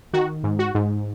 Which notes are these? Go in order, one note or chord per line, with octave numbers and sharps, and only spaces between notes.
D#3 F#4
G#2
F#4
G#2